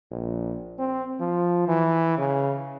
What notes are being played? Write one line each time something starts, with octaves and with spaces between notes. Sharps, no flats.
A#1
C4
F3
E3
C#3